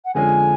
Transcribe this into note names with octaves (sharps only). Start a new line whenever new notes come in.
F#5
F2 D3 G#3 C#4 F4 G#5